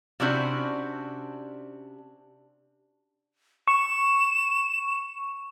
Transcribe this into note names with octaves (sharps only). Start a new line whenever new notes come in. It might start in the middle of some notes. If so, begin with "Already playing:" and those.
C3 C#4 D4 E4 F#4 C5
C#6 E7